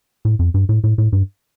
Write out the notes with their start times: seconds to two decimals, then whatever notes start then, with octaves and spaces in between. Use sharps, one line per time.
0.25 A2
0.39 F2
0.54 G2
0.69 A2
0.84 A2
0.98 A2
1.12 G2